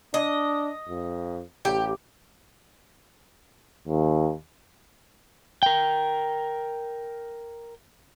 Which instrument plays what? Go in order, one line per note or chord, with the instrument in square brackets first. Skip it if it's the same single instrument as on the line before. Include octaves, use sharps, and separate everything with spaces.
[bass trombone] D4 [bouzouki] D#5
[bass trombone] F2
[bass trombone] A1 [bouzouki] G4
[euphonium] D#2
[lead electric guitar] A#4 G5